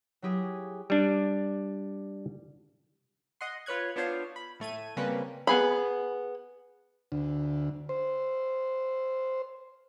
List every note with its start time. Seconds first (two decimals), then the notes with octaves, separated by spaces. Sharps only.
0.22 F#3 E4 G4 G#4
0.90 G3 D4
3.41 D#5 F#5 C6
3.66 F4 B4 C#5 F#6 G#6
3.96 B3 D4 F4 C5 C#5 F5
4.36 B5
4.60 A2 A3 G#6 D#7
4.97 C#3 G3 A#3 C4 C#4 B4
5.47 B3 G#4 B5
7.12 D2
7.89 C5